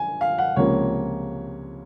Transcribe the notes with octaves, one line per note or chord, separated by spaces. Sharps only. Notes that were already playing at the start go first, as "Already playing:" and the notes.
Already playing: G#5
F5
F#5
C#2 C3 F3 A#3 C#4 C#5